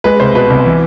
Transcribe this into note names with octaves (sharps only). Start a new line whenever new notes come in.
G#3 B4
C2 C5
B2 B4
C2
E3